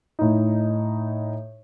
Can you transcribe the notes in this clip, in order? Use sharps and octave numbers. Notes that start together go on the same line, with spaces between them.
A2 D#4